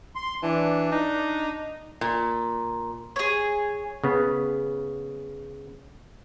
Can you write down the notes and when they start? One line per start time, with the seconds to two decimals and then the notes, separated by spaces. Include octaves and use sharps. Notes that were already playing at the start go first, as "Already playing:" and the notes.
0.16 C6
0.43 E3 D4
0.92 D#4
2.01 A#2
3.16 G#4 C#5
4.04 C#3 B3